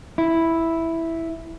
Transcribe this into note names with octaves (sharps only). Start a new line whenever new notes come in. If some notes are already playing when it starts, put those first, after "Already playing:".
E4